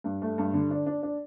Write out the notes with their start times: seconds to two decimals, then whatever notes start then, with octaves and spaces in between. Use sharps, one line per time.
0.04 G2
0.22 A3
0.38 G2
0.54 D3
0.71 D4
0.86 D4
1.03 D4